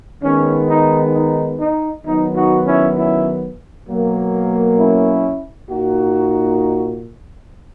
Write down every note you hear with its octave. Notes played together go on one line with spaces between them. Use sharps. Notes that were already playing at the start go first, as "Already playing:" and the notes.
D#3 G#3 B3 C#4
D#4
D#4
D#4
D#3 F#3 B3 D#4
D#4 F#4
C#4 E4
C#4 E4
B2 F#3 A#3
C#4 E4
A#2 A#3 D#4 F#4